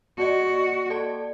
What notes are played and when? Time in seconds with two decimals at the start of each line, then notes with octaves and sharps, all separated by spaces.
0.18 A#3 F#4 D5 D#5
0.90 A4 D5 A5